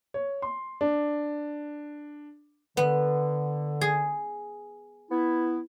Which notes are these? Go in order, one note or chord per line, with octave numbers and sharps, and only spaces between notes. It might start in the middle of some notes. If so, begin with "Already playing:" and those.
C#5
C6
D4
D3 B3
G#4
B3 E4